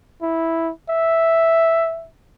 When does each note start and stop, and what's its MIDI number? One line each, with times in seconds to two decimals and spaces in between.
0.22 0.71 64
0.89 2.08 76